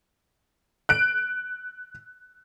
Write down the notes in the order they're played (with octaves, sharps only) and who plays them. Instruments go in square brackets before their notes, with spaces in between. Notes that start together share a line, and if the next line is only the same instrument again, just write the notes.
[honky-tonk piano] F#6 D7